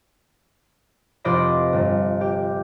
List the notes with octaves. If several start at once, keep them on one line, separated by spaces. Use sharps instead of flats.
F1 F4 C5 D5 D#5 B5
G1
G4